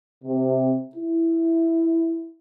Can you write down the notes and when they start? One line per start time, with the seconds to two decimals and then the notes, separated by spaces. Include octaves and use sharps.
0.24 C3
0.96 E4